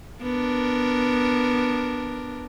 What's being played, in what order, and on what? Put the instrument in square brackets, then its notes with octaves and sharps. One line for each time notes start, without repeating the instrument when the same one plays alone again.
[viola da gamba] B3 D4 A#4